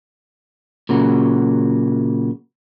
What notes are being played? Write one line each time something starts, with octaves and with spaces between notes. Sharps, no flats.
A#2 C#3 F#3